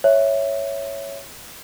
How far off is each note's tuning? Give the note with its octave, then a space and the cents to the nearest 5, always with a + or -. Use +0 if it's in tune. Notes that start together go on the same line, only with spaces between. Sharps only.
C#5 +0 E5 +0